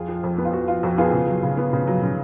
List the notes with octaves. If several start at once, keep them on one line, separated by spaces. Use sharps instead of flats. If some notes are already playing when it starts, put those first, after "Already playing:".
Already playing: F2 F4 G#4
F3
F2
B3
F4
F2 F#4
F3 F4
F2 F#4
B3 F4 G#4
C#3
F#3
C#3
B3
C#3
F#3
C#3